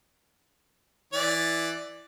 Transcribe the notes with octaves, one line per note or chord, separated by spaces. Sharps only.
E3 D5